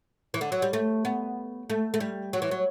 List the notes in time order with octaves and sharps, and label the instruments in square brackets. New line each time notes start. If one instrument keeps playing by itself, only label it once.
[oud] E3
D3
F#3
G3
A3
B3
A3
A3
G3
F#3
E3
F#3